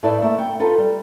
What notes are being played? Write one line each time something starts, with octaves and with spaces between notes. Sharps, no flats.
A2 A3 D#4 E4 B4 D5
A3 A#3 E4
B3 F#5 G5
D#4 F4 A4 B4
G3